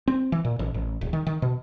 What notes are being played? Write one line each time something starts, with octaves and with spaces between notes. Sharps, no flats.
C4
E3
A#2
A1
A1
D1
D#3
D#3
B2